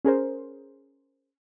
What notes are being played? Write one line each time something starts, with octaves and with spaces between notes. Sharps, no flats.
C#4 G#4 A#4 C5